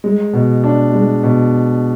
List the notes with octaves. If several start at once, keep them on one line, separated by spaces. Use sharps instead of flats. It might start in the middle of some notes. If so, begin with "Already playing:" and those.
G#3
B2
D4
G#3
B2